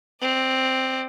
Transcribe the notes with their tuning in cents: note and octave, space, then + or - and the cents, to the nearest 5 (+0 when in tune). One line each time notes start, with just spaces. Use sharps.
C4 +0 D5 +40